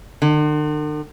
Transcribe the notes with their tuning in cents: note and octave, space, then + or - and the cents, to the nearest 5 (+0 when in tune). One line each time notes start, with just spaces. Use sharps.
D3 +45